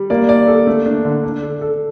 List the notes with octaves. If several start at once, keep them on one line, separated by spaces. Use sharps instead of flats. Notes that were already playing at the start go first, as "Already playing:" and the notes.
Already playing: G3
A#3 D5
D5
A4
A3
D4
D3
D4
A4
A4